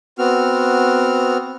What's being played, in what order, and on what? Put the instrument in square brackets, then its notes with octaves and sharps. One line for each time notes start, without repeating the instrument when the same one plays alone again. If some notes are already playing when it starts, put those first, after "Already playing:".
[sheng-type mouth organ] B3 C4 F#4 F6